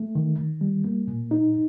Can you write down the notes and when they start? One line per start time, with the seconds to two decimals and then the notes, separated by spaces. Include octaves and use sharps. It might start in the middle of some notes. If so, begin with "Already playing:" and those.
Already playing: A3
0.15 D#3
0.39 D#3
0.61 G3
0.85 A#3
1.07 A#2
1.31 D#4